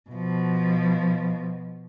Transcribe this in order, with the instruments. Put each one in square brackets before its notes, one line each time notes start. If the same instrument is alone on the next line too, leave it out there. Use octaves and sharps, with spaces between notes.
[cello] B2 F3